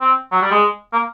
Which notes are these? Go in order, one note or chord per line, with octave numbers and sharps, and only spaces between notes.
C4
F#3
G3
G#3
A#3